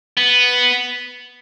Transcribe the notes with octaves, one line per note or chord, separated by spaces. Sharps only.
B3